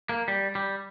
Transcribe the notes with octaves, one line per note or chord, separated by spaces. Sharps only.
A#3
G3
G3